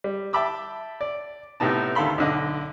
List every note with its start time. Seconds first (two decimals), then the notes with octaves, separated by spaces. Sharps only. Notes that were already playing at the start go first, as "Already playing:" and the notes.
0.04 G3
0.33 E5 G5 A5 B5 D6 E6
1.01 D5
1.60 A2 C3 B3 D#4 A5
1.95 D2 D#3 A4 F5 B5 C6
2.18 B1 D3 D#5